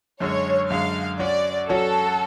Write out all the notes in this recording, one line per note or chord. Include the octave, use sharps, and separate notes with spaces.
F#2 D3 G#3 C#5
F#2 D3 G#3 F5
F#3 C#4 F#4 C#5 D5
F#3 C#4 F#4 A4 C#5